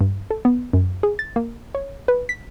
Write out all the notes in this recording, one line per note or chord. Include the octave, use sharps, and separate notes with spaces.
G2
A4
B3
F#2
G#4
A6
A#3
C#5
B4
B6